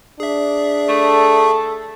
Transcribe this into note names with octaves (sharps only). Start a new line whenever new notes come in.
D4 G#4 E5
A3 A4